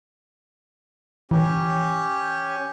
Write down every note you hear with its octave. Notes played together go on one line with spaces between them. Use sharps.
E3 C#4 G4